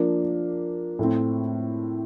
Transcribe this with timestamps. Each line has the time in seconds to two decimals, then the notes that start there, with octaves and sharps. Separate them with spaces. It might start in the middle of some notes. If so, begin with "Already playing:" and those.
Already playing: F3 A#3 D4
0.99 A2 A3 C4